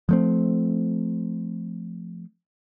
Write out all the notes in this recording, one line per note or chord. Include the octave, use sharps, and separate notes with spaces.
F3 A3 C4